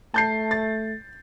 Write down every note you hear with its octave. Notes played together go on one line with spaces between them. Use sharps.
A3 A5 G6 C7
A6